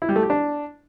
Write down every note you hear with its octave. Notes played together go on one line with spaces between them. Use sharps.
E4
G3
A3
G4
D4